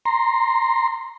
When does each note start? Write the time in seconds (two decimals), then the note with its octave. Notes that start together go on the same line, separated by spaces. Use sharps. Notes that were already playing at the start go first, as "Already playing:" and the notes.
0.05 A#5 C6